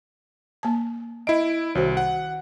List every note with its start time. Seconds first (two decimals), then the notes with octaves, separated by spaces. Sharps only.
0.63 A#3 A5
1.27 E4 D#5 D7
1.75 C2 D#3 F#4 C5
1.97 F#5